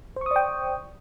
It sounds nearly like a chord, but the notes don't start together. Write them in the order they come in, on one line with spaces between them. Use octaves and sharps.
C5 C#6 D#6 D5 G5